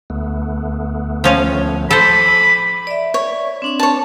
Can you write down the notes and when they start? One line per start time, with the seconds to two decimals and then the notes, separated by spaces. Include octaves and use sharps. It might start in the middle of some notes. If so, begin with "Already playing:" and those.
0.10 D2 A3 B3
1.24 F3 C#4 F5
1.91 A4 C5 G#5 B5 D6
2.87 D5 E5
3.14 C#5
3.62 C4 D4 D6
3.79 C#5 A5